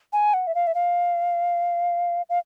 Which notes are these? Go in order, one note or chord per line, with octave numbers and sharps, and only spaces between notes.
G#5
F#5
E5
F5
E5
F5
F5